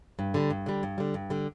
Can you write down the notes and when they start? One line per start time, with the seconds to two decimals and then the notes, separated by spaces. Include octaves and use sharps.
0.19 G2
0.34 D3 G3
0.50 G2
0.66 D3 G3
0.83 G2
0.98 D3 G3
1.14 G2
1.30 D3 G3